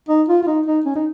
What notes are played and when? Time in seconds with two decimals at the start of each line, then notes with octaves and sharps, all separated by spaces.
0.08 D#4
0.29 F4
0.43 F4
0.47 D#4
0.66 D#4
0.85 C#4
0.95 D#4